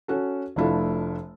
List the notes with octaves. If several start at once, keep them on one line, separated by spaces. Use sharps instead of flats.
C#4 F#4 A4
F1 A3 D4 E4 F4 A4